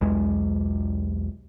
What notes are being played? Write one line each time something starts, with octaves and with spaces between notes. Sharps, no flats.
B1 E2 G#3